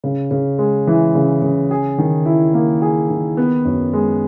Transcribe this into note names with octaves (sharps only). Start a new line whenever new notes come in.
C#3
C#3
G#3
E3
C#3
C#3
G#4
D#3
E4
A#3
G#4
D#3
B3
F#2
G#3